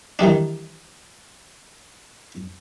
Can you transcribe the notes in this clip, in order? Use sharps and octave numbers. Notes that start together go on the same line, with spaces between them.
D#3 E3 G3 D4